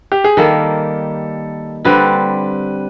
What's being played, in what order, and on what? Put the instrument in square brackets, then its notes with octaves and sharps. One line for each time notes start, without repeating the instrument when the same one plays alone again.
[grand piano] G4
G#4
[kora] D#3 G3 A#3 [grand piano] A4
[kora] D3 G3 C4 [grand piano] B4